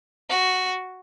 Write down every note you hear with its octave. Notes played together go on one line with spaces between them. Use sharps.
F#4